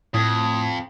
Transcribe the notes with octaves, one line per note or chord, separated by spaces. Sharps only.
F2 A2 D#6 G#6